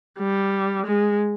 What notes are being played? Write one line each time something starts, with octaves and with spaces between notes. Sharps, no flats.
G3
G#3